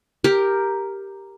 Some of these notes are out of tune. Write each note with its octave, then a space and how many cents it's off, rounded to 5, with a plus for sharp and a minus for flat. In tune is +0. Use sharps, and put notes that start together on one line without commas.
G4 +5 A#4 +0